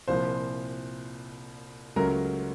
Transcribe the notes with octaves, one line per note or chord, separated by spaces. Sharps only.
C2 A#2 F3 C5
C#2 C#3 F#3 A3 A#4